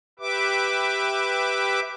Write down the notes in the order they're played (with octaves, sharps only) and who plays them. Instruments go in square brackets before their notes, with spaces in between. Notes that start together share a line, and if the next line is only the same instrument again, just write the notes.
[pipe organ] G4 B4 E5 D6